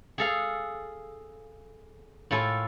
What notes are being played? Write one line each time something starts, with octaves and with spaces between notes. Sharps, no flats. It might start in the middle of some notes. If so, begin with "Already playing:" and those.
G#4 A4 F5
A2 F4 A4 G#5